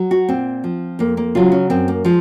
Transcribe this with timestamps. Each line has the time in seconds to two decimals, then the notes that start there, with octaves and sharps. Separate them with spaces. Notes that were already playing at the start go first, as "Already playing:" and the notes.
Already playing: F#3
0.11 F#4
0.28 A#2 C4
0.64 F3
0.99 F2 A#3
1.17 A#3
1.35 C#3 F#3 F4
1.52 C#4
1.70 F#2 C4
1.88 A#3
2.05 F3 G#3